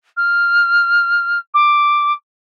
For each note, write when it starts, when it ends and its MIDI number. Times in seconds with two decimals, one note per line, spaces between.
0.17 1.39 89
1.54 2.13 86